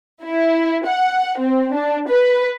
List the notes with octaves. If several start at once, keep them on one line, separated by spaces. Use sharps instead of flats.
E4
F#5
C4
D4
B4